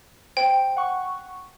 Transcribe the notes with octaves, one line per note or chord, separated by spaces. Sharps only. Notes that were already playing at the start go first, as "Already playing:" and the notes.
C5 G5
F#5 C#6